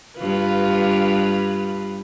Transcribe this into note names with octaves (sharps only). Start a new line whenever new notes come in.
G2 F4 B4